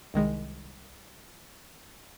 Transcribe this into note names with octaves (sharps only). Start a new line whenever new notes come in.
C2 D#3 G#3